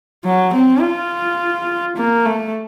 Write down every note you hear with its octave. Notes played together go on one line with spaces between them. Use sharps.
F#3
C4
F4
A#3
A3